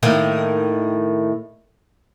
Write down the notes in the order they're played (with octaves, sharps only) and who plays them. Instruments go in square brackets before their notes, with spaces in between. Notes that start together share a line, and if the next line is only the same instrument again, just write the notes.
[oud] A2 D#3 A#3